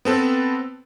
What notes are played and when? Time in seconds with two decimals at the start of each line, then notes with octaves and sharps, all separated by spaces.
0.05 B3 C4 A4 B4